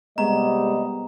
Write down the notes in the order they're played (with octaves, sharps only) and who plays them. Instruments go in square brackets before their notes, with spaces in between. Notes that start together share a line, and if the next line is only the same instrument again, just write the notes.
[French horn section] C3 G3 D#5 [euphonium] G#3 [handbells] B3 [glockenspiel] A#5